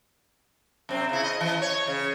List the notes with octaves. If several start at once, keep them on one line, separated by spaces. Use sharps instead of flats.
F#2 C3 C4
C#3 E4
D#5
E3
C#5
C#3